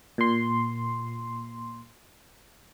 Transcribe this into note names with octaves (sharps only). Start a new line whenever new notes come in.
A#2 C6